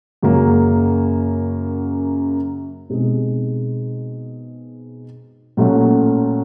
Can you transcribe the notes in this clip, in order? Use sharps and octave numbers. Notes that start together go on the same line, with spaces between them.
F#2 C#3 F#3 A#3
B2 G#3 C4 D#4 G#4
A#2 F#3 A3 C#4 F#4